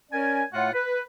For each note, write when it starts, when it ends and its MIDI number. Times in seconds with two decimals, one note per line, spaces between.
0.12 0.44 61
0.12 0.44 70
0.12 0.44 73
0.12 0.44 74
0.12 0.44 80
0.53 0.69 45
0.53 0.69 57
0.53 0.69 65
0.53 0.69 78
0.73 1.02 71